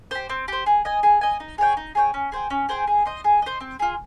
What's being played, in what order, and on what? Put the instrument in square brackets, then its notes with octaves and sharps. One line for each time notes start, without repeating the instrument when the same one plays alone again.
[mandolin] G4 C5
C4
G4 C5
G#4
D#5 G#5
G#4
D#5 G#5
D#4
G#4 C#5 G5
D#4
G#4 C#5 G5
C#4
G#4 C5 G5
C#4
G#4 C5 G5
G#4
C5 D#5
G#4
C5 D#5
C4
F4 G#4